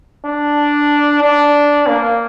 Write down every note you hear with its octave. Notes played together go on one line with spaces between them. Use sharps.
D4
D4
A#3